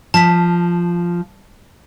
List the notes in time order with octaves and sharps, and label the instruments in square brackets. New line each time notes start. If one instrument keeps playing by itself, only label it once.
[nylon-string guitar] F3 [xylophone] A5 B6